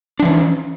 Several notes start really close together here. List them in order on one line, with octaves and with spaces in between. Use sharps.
D4 F3 E3 C#4